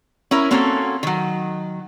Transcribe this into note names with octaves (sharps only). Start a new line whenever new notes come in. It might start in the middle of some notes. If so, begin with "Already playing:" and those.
C#4 E4 A#4
A#3 C4 C#4 F#4 A4
D#3 F#3